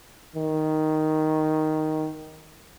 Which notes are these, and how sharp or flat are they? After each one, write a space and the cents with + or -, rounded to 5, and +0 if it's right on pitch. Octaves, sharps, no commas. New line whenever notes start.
D#3 +0